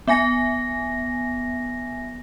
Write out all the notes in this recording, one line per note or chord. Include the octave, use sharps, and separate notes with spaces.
B3 E5 G#5 A#6